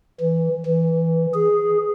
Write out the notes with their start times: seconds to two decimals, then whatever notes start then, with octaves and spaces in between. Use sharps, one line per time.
0.20 E3
0.66 E3
1.34 G#4